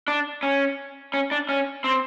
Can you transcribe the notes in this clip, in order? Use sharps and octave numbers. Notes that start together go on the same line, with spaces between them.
D4
C#4
C#4
D4
C#4
C4